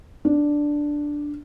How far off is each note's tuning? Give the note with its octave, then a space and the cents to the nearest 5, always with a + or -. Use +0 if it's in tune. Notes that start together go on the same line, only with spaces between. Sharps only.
D4 +0